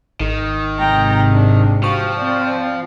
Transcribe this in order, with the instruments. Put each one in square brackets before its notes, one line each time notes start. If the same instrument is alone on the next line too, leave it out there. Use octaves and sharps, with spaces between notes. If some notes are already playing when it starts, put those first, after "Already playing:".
[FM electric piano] G#1 [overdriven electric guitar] D#3
[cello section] G#2 C3 [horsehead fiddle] G5 A#5
[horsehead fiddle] D4
[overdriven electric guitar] F3 [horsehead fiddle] F#4 G4 [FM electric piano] C#6
[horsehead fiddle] C4 D5